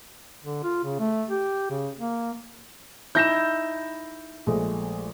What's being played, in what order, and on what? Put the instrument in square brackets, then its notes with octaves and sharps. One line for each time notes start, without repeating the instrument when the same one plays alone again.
[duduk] D3
F4
C#3
A3
G4
C#3
A#3
[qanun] D#4 E4 [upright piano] G6 A#6 E7
[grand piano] A#1 G#3 A3